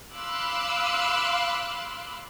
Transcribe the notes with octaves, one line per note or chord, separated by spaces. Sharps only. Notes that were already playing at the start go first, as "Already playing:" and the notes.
F5 B5 C6 D6 E6 F#6